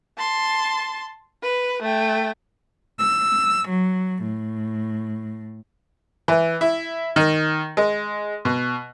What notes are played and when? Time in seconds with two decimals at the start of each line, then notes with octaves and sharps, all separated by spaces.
0.18 A5 C6
1.43 B4
1.82 A3 G5
2.98 E6
3.69 F#3
4.23 A2
6.28 E3
6.61 E4
7.16 D#3
7.77 G#3
8.45 B2